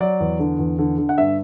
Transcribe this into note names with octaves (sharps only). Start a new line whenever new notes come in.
F#3 D5
E2
D3
E2
D3
D3
F#5
G2 E5